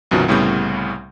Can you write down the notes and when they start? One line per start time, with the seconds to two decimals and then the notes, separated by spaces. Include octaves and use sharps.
0.11 C2 F#2 B2 D#3 F3 F#3
0.28 C2 A2 C#3 G3 B3 G6